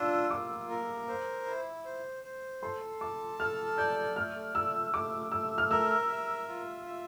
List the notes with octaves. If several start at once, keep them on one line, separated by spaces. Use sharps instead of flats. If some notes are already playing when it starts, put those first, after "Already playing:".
Already playing: D4 F4 E6
A#3 D6
A#4
C5
E4
C5
C5
A4 C6
A5 D6
A4 F6
D5 G6
A3 F6
A3 E6
A3 D6
A3 E6
F6
A#4 E6
E5
F4
E5